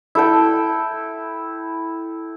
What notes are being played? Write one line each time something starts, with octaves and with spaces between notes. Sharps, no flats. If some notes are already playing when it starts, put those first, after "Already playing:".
E4 A4 G5